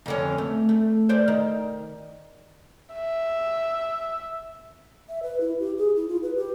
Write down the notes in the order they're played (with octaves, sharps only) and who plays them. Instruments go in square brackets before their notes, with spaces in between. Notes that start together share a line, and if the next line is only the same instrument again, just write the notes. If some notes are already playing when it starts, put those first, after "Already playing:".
[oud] F2 D3 C#4
A3
A3
C5 D5
D#3
[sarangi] E5
[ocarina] E5
B4
E4
G4
G#4
E4
F4
B4
G4